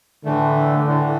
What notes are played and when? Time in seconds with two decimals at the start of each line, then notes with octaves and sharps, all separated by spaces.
0.25 A2 D3 E3 A3
0.87 A2 E3 A3